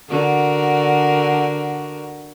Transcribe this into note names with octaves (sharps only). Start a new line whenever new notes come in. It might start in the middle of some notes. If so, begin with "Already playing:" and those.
D3 F#4 A#4